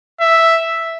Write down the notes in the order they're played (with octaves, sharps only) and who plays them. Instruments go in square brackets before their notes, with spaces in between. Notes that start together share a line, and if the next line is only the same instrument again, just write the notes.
[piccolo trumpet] E5